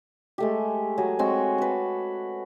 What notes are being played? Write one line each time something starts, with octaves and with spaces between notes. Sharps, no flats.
G#3 A3 G4
F#3 G#4
G#3 C4 F#4 C#5
A4 B4